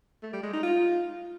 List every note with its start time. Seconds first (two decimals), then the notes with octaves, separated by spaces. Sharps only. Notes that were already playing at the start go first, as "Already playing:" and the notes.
0.23 A3
0.33 G3
0.43 G#3
0.53 D#4
0.63 F4